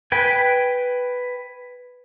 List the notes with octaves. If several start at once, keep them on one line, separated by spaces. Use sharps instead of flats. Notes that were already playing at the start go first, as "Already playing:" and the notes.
B4 G5 G#5